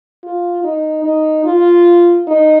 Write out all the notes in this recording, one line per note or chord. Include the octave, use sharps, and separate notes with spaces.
F4
D#4
D#4
F4
D#4